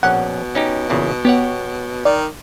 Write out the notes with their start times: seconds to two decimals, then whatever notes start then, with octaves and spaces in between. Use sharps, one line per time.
0.03 A#1 B2 C#4 F#5
0.55 C#4 D#4 G4
0.90 E2 A#2 C#3
1.25 B3 G4 C#5 F#5
2.05 D#3 D5